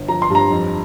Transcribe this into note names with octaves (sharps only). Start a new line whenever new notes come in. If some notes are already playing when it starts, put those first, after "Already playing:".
Already playing: G1
F3 A#5
C6
G2 A#5
F2